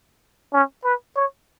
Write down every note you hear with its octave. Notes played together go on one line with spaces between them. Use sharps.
C#4
B4
C#5